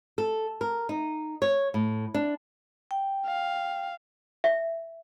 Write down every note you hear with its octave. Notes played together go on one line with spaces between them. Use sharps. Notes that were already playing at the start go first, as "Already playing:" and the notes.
A4
A#4
D#4
C#5
A2
D4
G5
F5
E5